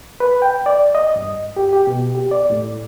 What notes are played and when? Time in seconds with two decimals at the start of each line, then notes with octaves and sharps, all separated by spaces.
0.20 B4
0.42 G5
0.66 D5
0.95 D#5
1.16 G2
1.57 G4
1.73 G4
1.87 B2
2.15 G4
2.31 D5
2.50 A2